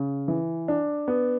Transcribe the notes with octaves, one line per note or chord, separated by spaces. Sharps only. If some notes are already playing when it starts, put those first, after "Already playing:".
Already playing: C#3
E3
D4
B3